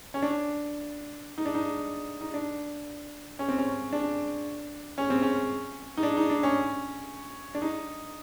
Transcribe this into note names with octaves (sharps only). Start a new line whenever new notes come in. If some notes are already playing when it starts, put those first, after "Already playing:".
C#4
D4
D#4
D4
D#4
D#4
D4
C#4
C4
C#4
D4
C#4
C4
C#4
D#4
D4
D#4
D4
C#4
D4
D#4